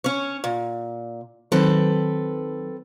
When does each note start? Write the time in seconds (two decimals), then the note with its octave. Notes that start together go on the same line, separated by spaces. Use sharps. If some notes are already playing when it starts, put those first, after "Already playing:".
0.04 C#4 C#5
0.44 A#2
1.52 D#3 F#3 C4 A4 B4